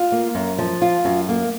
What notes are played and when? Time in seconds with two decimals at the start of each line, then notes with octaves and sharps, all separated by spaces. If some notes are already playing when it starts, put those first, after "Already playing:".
Already playing: F4
0.12 A#3
0.35 F#2
0.59 F3
0.82 F4
1.05 F#2
1.29 A#3